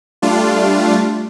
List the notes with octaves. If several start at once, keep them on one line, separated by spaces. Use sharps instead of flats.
G3 A3 D4 F4